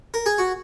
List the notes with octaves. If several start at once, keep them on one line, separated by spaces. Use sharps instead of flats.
A#4
G#4
F#4